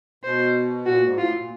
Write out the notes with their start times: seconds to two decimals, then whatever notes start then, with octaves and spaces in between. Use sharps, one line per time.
0.24 B2 C5
0.86 A#2 F#4
1.02 G#2
1.17 A2 F4
1.33 A#2